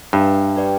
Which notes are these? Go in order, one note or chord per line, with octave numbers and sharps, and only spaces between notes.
G2 D4 B4 E5
G4 B4 D5 G5